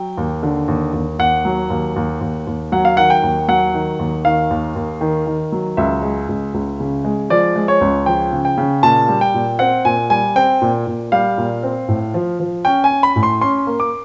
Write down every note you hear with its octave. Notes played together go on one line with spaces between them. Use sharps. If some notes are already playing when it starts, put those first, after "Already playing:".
Already playing: F#3 G5
D#2
D3
D#2
D#2
D#2 F#5
F#3
D#2
D#2
D#2
D#2
F#3 F#5
F5
D#3 F#5
G5
D#2
F#3 F#5
D#3
D#2
D#3 F5
D#2
D#2
D#3
D#3
F#3
C#2 E5
G#3
C#2
C#2
C#3
G#3
F3 D5
G#3
C#5
C#2
F3 G5
C#3
G5
C#3
A#2 A5
G3
G5
A#2
C4 F#5
A#2 G#5
G3 G#5
C4 G5
A#2
A#2
G3 F5
A#2
C4
A2
F3
F3
C#4 G5
G#5
C#4
B5
A2
C6
C#4 C6
A#3
D6